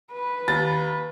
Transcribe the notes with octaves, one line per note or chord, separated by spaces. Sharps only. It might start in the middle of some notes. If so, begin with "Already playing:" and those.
B4
D#2 A6